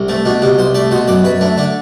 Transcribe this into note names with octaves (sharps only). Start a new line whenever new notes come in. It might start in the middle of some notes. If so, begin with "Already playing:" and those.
Already playing: C2
A3 C4
B2 D4
C2 D4
C2 C5
A3 D5
B2 C5
F#2 D5
F#2 B4
A3 D4
D3 D4